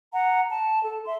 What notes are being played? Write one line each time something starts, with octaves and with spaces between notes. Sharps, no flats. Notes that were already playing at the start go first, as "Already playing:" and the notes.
F#5 A#5
A5
A4
E5 C6